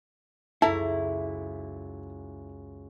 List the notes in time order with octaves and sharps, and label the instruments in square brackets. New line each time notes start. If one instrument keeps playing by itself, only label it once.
[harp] C#2 F#2 [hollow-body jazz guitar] E4 [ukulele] A4 E5 A#5 [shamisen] A5